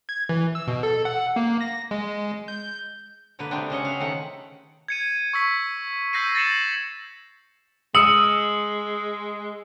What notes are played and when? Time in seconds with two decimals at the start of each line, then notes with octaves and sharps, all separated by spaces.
0.09 G#6
0.29 E3
0.55 E6
0.68 B2
0.83 A4
1.05 F#5
1.36 A#3
1.61 A#6
1.91 G#3
2.48 G6
3.39 B2 D3 A#3 B4
3.51 C3 B3 C4 D4
3.70 C#3 C#4 D#5 F#5
3.85 E5 F5
4.00 C3 D#3 A3 F#5
4.88 G#6 C#7 D#7
5.33 C#6 E6 B6
6.13 E6 G6 A#6 C7 D#7
6.35 A6 A#6 C7 C#7 E7 F#7
7.95 G#3 D#6 E6 C#7 F#7